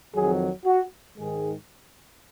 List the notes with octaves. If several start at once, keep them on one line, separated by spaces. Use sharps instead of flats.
F2 D#3 F#3 G#4
F#4
G#2 D#3 G#3 G#4